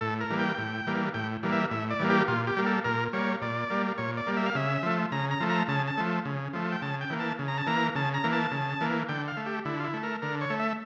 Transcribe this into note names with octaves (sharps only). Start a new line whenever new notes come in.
A2 A4
A#4
E3 G3 A#3
G5
A2
E3 G3 A#3
A2 G5
E3 G3 A#3
E5
A2 E5
D5
E3 G3 A#3
G4
A#2 F4
G4
G3 A#3
A4
A#2 A#4
G3 A#3 C#5
A#2 D5
G3 A#3
A#2 C#5
D5
G3 A#3
E5
F5
C#3 E5
F3 A3
C#3 A#5
A#5
F3 A3
A#5
C#3 A5
A5
F3 A3
C#3
F3 A3
G5
C#3 A5
G5
E3 A#3
A5
C#3
A#5
A5
E3 A#3 A#5
C#3 A5
A#5
E3 A#3
A5
C#3
E3 A#3
D3 G5
F5
A3
G4
D3 E4
F4
E4
A3
A#4
D3 A#4
C#5
A3
E5